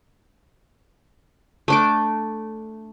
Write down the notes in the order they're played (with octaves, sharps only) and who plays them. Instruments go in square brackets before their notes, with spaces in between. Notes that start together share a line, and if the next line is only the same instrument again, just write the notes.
[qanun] A3 D4 D6